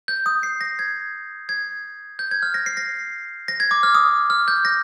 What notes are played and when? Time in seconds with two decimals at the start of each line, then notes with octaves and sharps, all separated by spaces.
0.08 G6
0.26 D#6
0.43 C7
0.61 A#6
0.79 G#6
1.49 G#6
2.19 G6
2.31 G#6
2.43 F6
2.54 A#6
2.66 C7
2.77 A#6
3.48 A#6
3.60 G#6
3.71 D6
3.83 F6
3.94 D#6
4.30 F6
4.48 G6
4.65 A#6